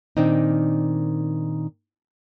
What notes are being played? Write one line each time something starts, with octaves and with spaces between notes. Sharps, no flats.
A#2 D#3 C4 D4 D#4